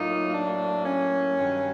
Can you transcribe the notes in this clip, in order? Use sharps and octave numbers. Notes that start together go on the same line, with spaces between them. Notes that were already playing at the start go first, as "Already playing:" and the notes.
Already playing: A2 F#3 A#3 D#4 F4
D4
C#4
G2 D#3 F#3